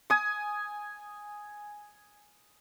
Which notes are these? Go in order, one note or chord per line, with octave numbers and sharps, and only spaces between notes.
G#5 D#6